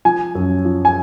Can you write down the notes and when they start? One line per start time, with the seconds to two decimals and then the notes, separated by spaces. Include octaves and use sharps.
0.05 F3 G#5
0.35 F#2
0.65 F3
0.85 G#5